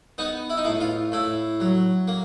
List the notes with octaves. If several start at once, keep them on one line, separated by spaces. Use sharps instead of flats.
B3 D#4
E4
D#4
A2 E4
F4
A2 E4
F#3
A#3